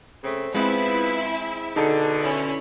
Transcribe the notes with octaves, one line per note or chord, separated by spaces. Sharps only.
C#3 A3 C4
G#3 B3 C4 E4 F4 B4 E5
B2 D3 D#4 G#4 A5
C#4 E4